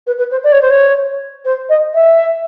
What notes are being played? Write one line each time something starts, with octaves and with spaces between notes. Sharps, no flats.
B4
B4
C5
D5
C#5
C5
C#5
C5
D#5
E5